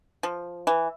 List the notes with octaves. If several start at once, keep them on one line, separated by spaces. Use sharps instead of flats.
F3
E3